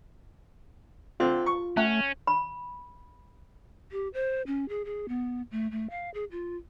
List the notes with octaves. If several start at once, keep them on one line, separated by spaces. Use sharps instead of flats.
D3 C4 F4
C#6
A3 C#4 F#5
B5
G4
C5
C#4
G#4
G#4
B3
A3
A3
F5
G#4
F4